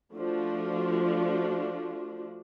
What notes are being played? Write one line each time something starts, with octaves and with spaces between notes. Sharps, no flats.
F3 A3 D4 F#4